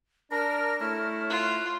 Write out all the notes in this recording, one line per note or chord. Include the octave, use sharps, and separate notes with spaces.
D4 A#4 A#6
A3 E4 C#5 F6
F4 F#6